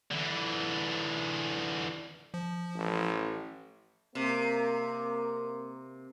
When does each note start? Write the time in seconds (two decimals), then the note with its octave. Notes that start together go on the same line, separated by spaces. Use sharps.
0.11 D3 E3
2.34 F3
2.76 A1
4.15 C3 A#3 A#4